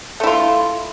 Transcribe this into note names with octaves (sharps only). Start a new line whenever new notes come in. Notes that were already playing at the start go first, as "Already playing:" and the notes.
A3 E4 F4